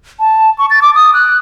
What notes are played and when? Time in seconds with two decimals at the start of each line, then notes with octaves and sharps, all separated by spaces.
0.20 A5
0.59 C#6
0.70 A6
0.82 D6
0.95 D#6
1.14 F#6